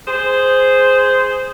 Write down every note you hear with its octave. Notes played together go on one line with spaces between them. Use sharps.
G#4 C5